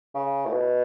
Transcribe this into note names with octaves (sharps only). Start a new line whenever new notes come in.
C#3
A2
B2